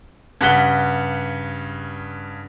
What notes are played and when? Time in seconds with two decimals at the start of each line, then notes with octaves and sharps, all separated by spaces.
0.41 G2 C#3 F#5 B6 G7